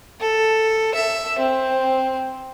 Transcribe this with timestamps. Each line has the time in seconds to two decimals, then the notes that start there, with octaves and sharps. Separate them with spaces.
0.21 A4
0.94 E5
1.39 C4